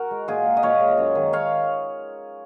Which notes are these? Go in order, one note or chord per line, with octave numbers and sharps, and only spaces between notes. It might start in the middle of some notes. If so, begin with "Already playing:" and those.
Already playing: F#4 A#4
G#3
A#2 F4 G#4
G#3
D#5
A#2 C#5 F5
G#3
F#2
D#3 G#3
C#5 F5